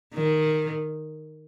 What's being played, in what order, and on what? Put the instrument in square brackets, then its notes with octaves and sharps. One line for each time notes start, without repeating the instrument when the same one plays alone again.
[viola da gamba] D#3